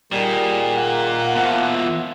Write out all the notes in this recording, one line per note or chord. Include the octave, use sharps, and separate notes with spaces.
A#2 D#3 G3 G#4
A#3 F#5
E2 B2 F3 E5